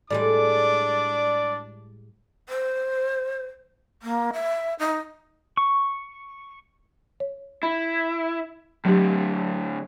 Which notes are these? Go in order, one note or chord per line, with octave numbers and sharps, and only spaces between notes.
A2 G3 G#3 D4 D5 D6
C5
A#3
E5
D#4
C#6
C#5
E4 B5
A2 D3 F#3 G4